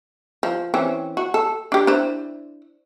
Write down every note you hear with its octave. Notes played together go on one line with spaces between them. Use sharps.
F3
E3 C4 C#4
F#4
A4
D4 G4
D4 E4 C5